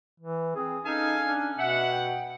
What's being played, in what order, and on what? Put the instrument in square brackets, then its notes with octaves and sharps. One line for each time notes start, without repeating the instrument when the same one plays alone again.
[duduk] E3
[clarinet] C4 [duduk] G#4
[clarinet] C#4 [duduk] D#4 [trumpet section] A4 F5 G#5
[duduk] D4
[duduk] B2 [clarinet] E5 [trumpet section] F#5
[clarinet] G5